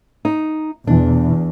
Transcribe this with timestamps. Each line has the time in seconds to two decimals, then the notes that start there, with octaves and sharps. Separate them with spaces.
0.25 D#4
0.87 E2 B2 E3 D4